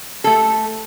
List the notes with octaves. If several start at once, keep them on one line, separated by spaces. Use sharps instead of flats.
A3 A4